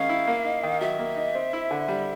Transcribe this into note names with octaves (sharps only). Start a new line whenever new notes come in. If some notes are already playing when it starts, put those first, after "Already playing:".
Already playing: D#3 G#3 C#4 F5
E4
A#3
D#4
D#3
F#3 E5
A#3
D#4
C4
E4
D3
G3